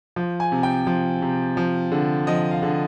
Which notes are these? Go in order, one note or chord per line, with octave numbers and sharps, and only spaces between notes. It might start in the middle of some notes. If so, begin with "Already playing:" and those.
F3
G#5
C3
G5
F3
C3
F3
D3
F3 D#5
F5
D3